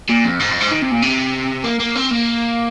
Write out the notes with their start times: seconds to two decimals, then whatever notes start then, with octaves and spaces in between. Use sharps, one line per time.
0.09 A#2
0.24 F2
0.40 G#2
0.51 F2
0.60 G#2
0.71 D#3
0.82 C3
0.91 A#2
1.02 C3
1.64 A#3
1.80 A#3
1.95 C4
2.11 A#3